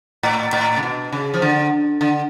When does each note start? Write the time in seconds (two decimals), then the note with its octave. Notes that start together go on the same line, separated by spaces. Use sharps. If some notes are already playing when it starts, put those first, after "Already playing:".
0.23 A2
0.53 A2
0.77 C#3
0.83 B2
1.12 C#3
1.34 F3
1.42 D3
2.01 D3